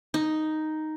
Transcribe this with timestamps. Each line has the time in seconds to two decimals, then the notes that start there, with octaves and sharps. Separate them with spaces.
0.14 D#4